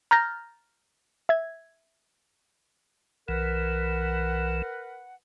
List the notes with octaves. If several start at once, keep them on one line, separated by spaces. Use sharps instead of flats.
A#5 F6 G6 A6 A#6
E5 G#6
B1 E3 A#4 B4 F#5